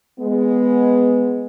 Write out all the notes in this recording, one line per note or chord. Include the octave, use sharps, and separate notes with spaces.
G#3 B3